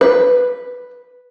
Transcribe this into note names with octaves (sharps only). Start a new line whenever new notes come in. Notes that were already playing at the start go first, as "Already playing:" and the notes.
B4